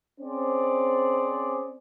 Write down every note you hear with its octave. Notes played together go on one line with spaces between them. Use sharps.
C4 C#4 G#4 C5 D5